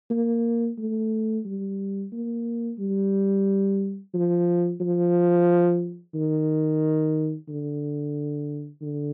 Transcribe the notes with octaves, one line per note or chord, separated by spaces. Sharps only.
A#3
A3
G3
A#3
G3
F3
F3
D#3
D3
D3